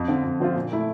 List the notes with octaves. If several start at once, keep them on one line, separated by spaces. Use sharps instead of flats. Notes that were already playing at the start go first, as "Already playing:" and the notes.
Already playing: F2
D3 F3 C4 F4
F2
D3 F3 C4 F4
A#2
A3 E4